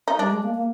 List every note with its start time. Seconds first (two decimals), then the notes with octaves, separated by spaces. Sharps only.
0.08 D#4
0.19 G3 D4
0.30 G#3
0.43 A#3
0.54 A#3